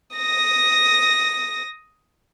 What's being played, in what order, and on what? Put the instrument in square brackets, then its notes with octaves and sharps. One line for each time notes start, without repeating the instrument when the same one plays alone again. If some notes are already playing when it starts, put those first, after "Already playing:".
[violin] D#6 A#6